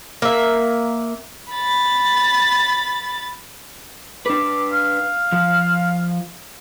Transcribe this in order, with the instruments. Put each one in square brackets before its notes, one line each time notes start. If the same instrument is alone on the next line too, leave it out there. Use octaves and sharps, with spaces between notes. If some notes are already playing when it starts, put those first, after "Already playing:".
[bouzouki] A#3 E5
[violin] B5 A6
[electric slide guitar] D4 B4 [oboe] D6
[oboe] F5
[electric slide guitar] F3